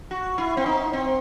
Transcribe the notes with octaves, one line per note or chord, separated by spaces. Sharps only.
F#4
E4
C4
D#4
C4